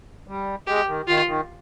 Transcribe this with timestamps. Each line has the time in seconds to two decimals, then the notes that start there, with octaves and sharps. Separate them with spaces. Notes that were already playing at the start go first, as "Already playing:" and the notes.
0.27 G3
0.67 G#3 G4
0.88 D#3
1.08 D#3 F4
1.27 D#3